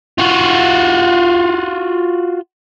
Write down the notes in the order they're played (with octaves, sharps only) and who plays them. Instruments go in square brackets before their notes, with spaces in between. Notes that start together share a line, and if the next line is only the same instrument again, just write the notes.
[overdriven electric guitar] F4 F#4